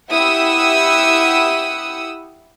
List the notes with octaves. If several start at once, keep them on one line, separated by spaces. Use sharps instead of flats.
E4 G4 F#5 D#6 E6